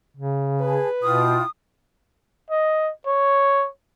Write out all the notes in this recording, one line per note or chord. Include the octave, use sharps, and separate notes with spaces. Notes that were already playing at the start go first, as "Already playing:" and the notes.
C#3
G#4 B4 A5
B2 E4 F4 G5 D#6
D#5
C#5